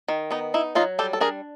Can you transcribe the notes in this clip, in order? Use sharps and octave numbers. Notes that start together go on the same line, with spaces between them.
D#3
B3 D#4
D#4 E4
F#3 D#4 F4
G3 G4 A4
A4
D4 G#4 A#4